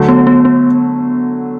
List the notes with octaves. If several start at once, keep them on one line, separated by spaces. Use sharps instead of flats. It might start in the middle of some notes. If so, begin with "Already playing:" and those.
Already playing: D3 F#3 A3
B3
B3
B3